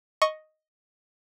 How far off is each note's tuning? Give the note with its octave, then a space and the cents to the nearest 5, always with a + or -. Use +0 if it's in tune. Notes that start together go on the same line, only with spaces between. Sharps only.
D#5 +0 C#6 -5